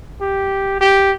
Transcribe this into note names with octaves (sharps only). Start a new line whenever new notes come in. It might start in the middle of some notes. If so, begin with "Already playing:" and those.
G4
G4